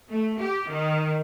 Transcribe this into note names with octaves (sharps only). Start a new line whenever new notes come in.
A3
G4
D#3